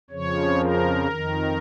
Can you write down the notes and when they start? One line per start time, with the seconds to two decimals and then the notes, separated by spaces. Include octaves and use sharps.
0.10 F2 C#3 F3 C#5
0.59 A#4
1.07 F2 D#3